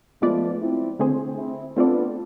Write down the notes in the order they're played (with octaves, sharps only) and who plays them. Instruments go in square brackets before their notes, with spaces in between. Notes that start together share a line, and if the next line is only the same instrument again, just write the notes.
[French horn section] F3 A3 [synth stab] G#3 B3 F4 B4 D5
[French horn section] C4 E4
[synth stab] D3 A3 C4 G#4 C5
[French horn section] C4 E4
[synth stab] A3 C4 F4 A4 D5 [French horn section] B3 D4